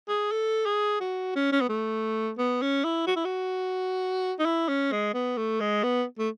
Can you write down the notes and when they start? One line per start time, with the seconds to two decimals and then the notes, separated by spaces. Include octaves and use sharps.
0.08 G#4
0.32 A4
0.66 G#4
1.00 F#4
1.36 C#4
1.52 C#4
1.61 B3
1.69 A3
2.38 B3
2.62 C#4
2.84 E4
3.07 F#4
3.16 E4
3.25 F#4
4.39 D#4
4.45 E4
4.68 C#4
4.92 G#3
5.14 B3
5.37 A3
5.60 G#3
5.83 B3
6.19 A3